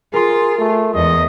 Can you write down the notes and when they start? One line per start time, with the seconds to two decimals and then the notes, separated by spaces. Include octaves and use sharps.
0.14 F4 G#4 A#4 C6
0.58 A3
0.94 E2 G#3 D#5